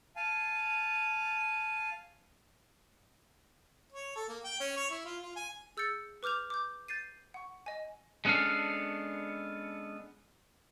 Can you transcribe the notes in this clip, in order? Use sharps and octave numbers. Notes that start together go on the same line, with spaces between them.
F5 G#5 A5
C#5
A4
A#3
G5
C#4
C#5
E4
F4
F4
G#5
G#4 E6 G6 A6 C#7
B4 D6 F6 G6 F7
D6 G6
G6 A6 C7 D#7
F#5 C#6
D#5 G#5
G#3 B3 C#4 D4 A4 F5